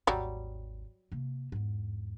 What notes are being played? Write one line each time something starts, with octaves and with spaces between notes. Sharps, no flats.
G#1 D#2 F#3 G3
C3 A#3
E2 G#2